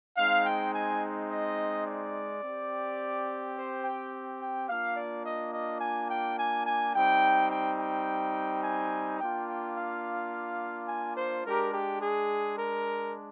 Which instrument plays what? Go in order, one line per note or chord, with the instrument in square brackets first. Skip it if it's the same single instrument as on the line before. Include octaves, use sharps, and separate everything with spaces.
[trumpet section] G#3 C4 D#4 F5
G5
G#5
D#5
D5
C4 G4
C5
G5
G5
A#3 D4 F4 F5
D5
D#5
D#5
G#5
G5
G#5
G#5
G3 C4 D#4 G5
G5
G5
G#5
A#3 D4 F4 G5
G5
F5
G#5
C5
G#3 D4 G4 A#4
G4
G#4
A#4